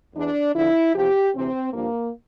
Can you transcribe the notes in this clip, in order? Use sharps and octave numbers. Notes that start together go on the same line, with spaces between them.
E2 E3 D4
E2 D3 F3 E4
E2 C3 F3 G4
D2 C3 E3 C4
G2 F3 A#3